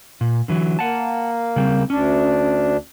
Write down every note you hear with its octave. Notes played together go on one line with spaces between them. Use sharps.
A#2
D3 E3 F#3
A#3 F#5 A5
C#3 G3 C4
D2 C#4 D4